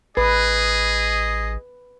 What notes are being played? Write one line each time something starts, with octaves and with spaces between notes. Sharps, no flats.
A1 G#4 B4 D#5